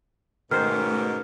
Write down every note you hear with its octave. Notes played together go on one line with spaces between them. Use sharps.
G#2 B2 D#3 A3 C#4 C5 D6 F6